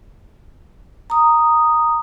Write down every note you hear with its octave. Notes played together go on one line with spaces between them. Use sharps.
A#5 D#6